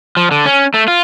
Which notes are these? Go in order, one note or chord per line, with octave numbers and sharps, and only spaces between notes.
F3
D3
C#4
A3
F4